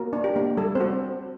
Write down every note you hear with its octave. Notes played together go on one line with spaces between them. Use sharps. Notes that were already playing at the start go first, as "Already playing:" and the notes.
Already playing: A#3 F#4 A#4
D4
G4
A#3
G3 A4
C4 C5
F#4